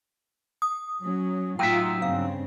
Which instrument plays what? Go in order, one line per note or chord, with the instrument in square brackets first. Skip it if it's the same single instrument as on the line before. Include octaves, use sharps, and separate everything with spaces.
[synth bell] D#6
[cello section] F#3 C#4
[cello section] A2 F4 [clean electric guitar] F#3 D#4 E5 [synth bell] G5
[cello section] G2 C#3 C4 [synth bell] F5